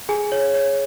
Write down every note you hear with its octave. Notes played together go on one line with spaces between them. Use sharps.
G#4 G#5
C#5
C#5